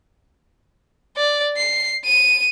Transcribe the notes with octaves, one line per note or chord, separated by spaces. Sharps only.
D5
C7
D#7